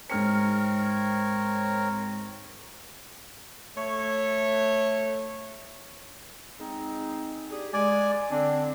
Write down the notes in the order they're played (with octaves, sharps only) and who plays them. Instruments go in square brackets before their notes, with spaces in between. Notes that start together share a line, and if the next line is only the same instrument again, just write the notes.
[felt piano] G#2 F6 C#7 [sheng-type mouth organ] C4 A#4 C#5
[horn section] A3 C#5
[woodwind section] G#3 C4 D#4
D4 G4 G#4
[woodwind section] G#3 [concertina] D5 G#5
[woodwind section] D3 C4 [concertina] D4